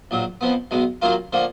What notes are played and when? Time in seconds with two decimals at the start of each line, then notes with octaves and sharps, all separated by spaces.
0.11 A#1 A#2 F#3
0.41 F2 F3 B3
0.71 B1 B2 G#3
1.02 F#2 D#3 F#3 A#3 F4
1.33 D3 F3 A#3